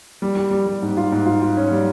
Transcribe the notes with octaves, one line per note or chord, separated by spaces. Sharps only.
G3
G3
G3
G3
G#2
F4
G#2
F4
F4
C#4
G3